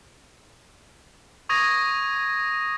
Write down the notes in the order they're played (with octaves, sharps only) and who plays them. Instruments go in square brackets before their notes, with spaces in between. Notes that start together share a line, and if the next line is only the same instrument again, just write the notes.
[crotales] C#6 D#6 G#6 A#6 D#7